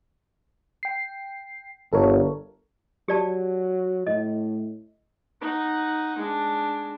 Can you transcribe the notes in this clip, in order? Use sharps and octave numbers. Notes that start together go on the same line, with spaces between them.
G5 C7
G1 A4 A#4 C#5
F#3 G4 D5 A5
A2 D#5
D#4 F#5
G#3 D4